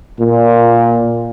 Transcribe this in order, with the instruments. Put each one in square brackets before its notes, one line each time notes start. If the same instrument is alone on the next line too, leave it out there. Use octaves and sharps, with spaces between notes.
[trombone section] A#2